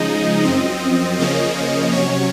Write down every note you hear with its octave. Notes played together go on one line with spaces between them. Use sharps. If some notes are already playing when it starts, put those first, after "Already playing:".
Already playing: C#3 F3 G#3 D#4 D#5
F#2 F3 C4
C#3 F3 A#3 C#4 D#5
C3 F#3 C#4 C#5